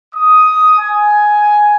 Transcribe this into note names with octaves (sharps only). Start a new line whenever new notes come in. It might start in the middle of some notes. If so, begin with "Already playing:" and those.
D#6
G#5